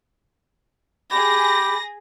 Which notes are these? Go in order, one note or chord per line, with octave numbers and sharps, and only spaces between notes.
G4 G#4 B5 A#6